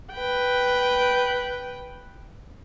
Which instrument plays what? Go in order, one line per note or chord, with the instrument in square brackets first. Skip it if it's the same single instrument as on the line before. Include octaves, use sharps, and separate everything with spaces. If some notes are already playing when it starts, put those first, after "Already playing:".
[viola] B4 G5